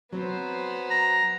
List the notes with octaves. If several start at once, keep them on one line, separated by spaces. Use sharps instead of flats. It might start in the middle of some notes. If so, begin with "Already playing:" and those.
F#3 B3 C4 C5
A#5